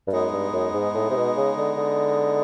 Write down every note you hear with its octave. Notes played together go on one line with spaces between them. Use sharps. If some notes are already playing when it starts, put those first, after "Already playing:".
G2
F#2 G#3 B3 D#4
G2
F#2
G#2
A2
C3
B2
C#3
D3
D3